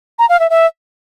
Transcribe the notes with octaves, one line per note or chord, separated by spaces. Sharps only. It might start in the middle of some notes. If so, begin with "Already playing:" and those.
A#5
F5
E5
E5